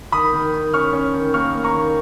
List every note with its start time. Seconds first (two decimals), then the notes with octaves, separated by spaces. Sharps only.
0.12 D#3 B5 D#6
0.33 D#3
0.53 D#3
0.73 C#4 C#6 F6
0.93 C#4
1.14 D#3
1.34 A#3 C#6 F6
1.54 A#3
1.64 A#5 C#6
1.74 D#3